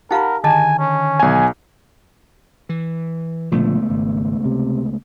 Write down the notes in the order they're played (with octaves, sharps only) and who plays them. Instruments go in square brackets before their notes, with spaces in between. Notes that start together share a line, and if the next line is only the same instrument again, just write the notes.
[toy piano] D#4 G4 F5 [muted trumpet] A#4 [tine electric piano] F#5 B5
[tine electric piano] D3 D#3 [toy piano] G#4 D#5 A5 [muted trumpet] G#5
[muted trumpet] C#4
[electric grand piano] B1 G#5
[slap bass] E3
[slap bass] C#2 A3 B3 [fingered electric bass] A#2 D3 F3
[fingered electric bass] G#1
C3